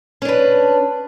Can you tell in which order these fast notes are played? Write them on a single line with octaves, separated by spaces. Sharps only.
C#4 D4 B4